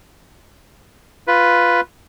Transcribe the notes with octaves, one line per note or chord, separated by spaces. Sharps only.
F4 B4